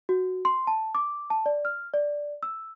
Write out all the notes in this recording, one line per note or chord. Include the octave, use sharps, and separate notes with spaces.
F#4
C6
A5
D6
A5
D5
F6
D5
E6